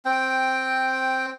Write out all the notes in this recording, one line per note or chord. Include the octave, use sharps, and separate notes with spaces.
C4 G5